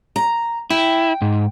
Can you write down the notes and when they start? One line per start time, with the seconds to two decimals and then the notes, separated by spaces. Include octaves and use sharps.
0.16 A#5
0.70 E4 G5
1.22 G#2